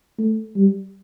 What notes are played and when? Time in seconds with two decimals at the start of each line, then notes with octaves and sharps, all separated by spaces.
0.18 A3
0.56 G3